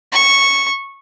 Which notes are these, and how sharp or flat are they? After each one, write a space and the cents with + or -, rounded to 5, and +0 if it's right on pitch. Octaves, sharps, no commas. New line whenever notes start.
C#6 -5